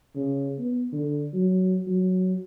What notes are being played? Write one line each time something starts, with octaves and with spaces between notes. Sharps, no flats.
C#3
B3
D3
F#3
F#3